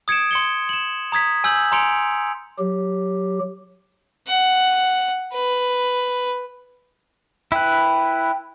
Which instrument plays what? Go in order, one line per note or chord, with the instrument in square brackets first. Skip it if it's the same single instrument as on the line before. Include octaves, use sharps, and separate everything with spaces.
[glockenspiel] D#6 G#6 C#7 D7 E7
C6 C#7 G7
E7 F#7
A#5 D#6 G#6 B6
G#5 E6 G6 F#7
G#5 A#5 C6 C#7 D7 F7
[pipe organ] F#3 G4
[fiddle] F#5
B4
[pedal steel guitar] E4 B4 [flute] G5